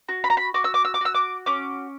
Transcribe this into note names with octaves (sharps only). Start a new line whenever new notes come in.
F#4
B5
A#5
B5
F#4 D6
E6
D6
E6
D6
F#4 E6
D6
C#4 D6